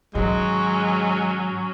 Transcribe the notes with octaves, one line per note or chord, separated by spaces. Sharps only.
G#2 D#3 F#3 G#3 C#4